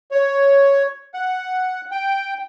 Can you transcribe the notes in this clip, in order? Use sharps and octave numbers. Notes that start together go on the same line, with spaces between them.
C#5
F#5
G5